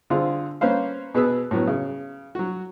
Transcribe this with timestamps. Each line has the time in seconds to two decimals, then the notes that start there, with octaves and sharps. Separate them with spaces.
0.10 D3 C4 F4 G#4
0.61 A#3 C#4 B4 C5 F5
1.15 B2 B3 G#4 B4 E6
1.51 A2 F#3 B3
1.68 C#3
2.35 F#3 F#4